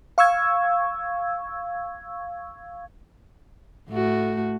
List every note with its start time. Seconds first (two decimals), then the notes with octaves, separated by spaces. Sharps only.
0.18 F5 C#6 E6 G#6
3.89 A2 A3 F#4